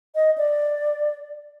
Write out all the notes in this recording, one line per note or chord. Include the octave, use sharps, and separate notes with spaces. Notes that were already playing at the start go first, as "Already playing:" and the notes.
D#5
D5